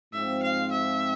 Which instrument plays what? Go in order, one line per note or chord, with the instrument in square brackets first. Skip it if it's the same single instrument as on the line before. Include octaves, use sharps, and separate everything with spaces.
[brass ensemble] G#2 F3 C4 F4 [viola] E5
[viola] F5
E5